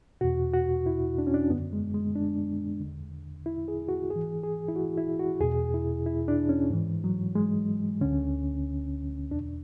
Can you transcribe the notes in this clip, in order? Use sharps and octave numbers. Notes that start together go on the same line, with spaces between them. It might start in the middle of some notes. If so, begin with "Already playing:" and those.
E2 B2 F#4
F#4
E4
D4
C#4
D4
F#2 D3 B3
G#3
G#3
D4
E2 D3
E4
G#4
F#4
G#2 G#4
E3
G#4
E4
F#4
E4
F#4
E2 B2 G#4
E4
E4
D4
C#4
G#2 E3
F#3
G#3
D2 D3 C#4
E2 B2 D4